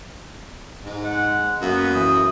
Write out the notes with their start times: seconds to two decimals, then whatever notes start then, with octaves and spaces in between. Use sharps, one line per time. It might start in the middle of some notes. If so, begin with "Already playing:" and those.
0.85 G#2
1.03 G#3 F#5
1.61 F#2 A#3 B3
1.94 E3 D#6